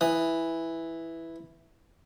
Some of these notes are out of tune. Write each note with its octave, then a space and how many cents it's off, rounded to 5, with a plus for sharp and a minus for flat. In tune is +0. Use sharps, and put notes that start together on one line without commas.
E3 +0 D#6 +0